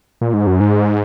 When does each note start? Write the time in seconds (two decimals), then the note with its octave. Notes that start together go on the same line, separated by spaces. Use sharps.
0.21 A#2
0.34 G#2
0.47 F#2
0.60 G#2